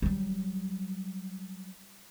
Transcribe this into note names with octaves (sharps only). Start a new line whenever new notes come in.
F#3 G3